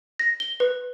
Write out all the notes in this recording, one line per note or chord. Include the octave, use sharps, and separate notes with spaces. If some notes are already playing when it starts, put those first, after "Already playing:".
A#6
G7
B4